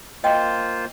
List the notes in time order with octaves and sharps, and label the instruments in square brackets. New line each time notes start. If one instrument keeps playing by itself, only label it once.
[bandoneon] A#3 F4 C5 [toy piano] D#5 G5